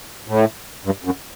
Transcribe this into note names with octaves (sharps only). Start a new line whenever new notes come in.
A2
G2
F#2